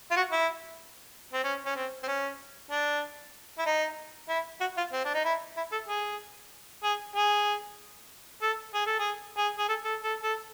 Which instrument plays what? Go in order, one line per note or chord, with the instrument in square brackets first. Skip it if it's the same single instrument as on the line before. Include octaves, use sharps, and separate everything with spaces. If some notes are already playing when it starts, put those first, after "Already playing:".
[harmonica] F4
F#4
E4
C4
C#4
C#4
C4
C4
C#4
D4
E4
D#4
E4
F#4
F4
C4
D4
D#4
E4
E4
A4
G#4
G#4
G#4
A4
G#4
A4
G#4
G#4
G#4
A4
A4
A4
A4